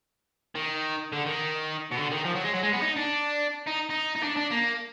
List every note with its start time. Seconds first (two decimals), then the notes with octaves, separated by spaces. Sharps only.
0.55 D#3
1.13 D3
1.26 D#3
1.91 B2
1.97 D3
2.11 D#3
2.25 F3
2.35 F#3
2.44 G#3
2.54 F#3
2.63 G#3
2.73 B3
2.82 D#4
2.97 D4
3.67 D#4
3.90 D#4
4.16 D#4
4.24 D4
4.37 D4
4.51 A#3